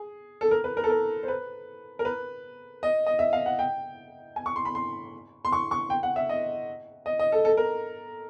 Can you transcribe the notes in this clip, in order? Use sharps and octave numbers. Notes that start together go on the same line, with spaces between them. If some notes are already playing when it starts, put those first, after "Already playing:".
Already playing: G#4
A4
A#4
B4
A#4
A4
A#4
C5
B4
A#4
B4
D#5
D#5
E5
F5
F#5
G5
G#5
C#6
C6
B5
C6
C6
C#6
C#6
G5
F#5
E5
D#5
D#5
D#5
A4
A4
A#4